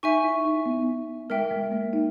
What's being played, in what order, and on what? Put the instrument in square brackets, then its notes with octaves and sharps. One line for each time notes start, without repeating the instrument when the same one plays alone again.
[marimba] D#4 [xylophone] E5 G#5 C#6
[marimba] E4
D#4
B3
[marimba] G#3 [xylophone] A#4 E5 G5
[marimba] G#3
A#3
D#4